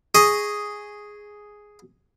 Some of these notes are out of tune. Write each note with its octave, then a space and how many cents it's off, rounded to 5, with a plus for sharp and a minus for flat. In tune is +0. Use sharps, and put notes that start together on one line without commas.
G#4 +0 D#5 +5 C#6 +0